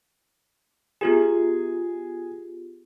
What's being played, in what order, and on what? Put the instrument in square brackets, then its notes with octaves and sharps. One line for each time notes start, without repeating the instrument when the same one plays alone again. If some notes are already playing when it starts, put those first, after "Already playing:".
[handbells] B3 F4 G4 [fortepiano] G#4